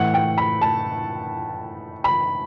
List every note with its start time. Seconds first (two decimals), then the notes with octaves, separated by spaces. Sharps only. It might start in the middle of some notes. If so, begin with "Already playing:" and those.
Already playing: A2 E3 A3 F#5
0.14 G5
0.38 B5
0.61 A5
2.04 B5